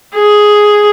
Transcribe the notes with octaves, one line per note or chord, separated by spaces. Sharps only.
G#4